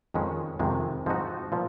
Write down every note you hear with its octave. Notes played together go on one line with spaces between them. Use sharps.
F2 D#3 G#3 C#4
F2 C3 D#3 G#3
G#2 F3 C4 D#4 F#4
A#2 F3